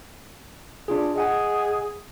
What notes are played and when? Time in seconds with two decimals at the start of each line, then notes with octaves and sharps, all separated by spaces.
0.88 D4 F4 G#4
1.16 G#4 D#5 F#5 G#5